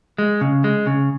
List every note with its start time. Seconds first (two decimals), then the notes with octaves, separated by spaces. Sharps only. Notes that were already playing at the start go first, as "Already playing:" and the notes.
0.18 G#3
0.41 C#3
0.64 G#3
0.87 C#3